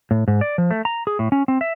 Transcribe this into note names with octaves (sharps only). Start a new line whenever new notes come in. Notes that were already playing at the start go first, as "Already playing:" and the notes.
A2
G#2
D5
F3
A3
A#5
G#4
A2
C#4
C4
E5